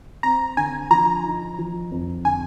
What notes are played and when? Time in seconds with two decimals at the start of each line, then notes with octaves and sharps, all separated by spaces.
0.23 C4 A#5
0.57 D3 G#5
0.90 F3 A#5
1.24 D#4
1.58 F3
1.91 F2
2.25 D3 G#5